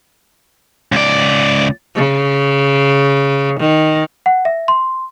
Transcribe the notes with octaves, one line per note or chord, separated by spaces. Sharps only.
C#2 D5
C#3
D#3
F#5
E5
C6